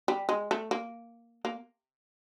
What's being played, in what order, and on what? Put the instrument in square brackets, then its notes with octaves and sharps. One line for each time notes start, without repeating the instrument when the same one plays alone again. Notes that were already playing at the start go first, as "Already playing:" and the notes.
[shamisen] G3
G#3
A3
A#3
A#3